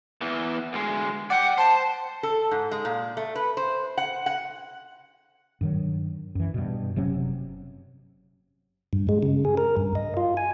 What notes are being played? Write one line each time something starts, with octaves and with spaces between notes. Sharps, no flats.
E2 E3
D2 G#3
D5 F#5 G5
C5 A5
A4
G#2
G#3
A#2
A3
B4
C5
F#5
F#5
G2 D#3 F#3
F#2 E3
G2 B2
F#1 C3 F#3 C#4
G2
G#3
C#3
G#4
A#4
G2
D#5
F4
G#5